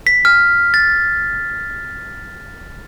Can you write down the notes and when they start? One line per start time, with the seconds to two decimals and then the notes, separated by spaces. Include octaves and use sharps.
0.07 B6
0.25 F6
0.74 A6